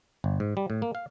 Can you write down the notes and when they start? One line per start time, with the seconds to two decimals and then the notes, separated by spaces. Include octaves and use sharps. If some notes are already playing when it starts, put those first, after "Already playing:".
0.24 G1
0.40 G#2
0.57 G3
0.70 A2
0.82 A#3
0.95 F5